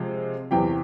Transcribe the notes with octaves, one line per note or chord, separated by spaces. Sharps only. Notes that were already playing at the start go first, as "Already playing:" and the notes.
Already playing: C3 F3 G#3
E2 C3 E3 G4 G5